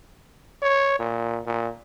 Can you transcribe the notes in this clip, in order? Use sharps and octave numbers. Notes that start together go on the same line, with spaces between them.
C#5
A#2
A#2